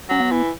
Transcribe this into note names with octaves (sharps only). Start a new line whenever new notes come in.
F#3 C#4
B3
E3